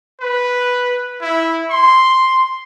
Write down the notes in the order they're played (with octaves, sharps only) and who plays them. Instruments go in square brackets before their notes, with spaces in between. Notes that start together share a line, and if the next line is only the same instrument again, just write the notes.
[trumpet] B4
E4
C6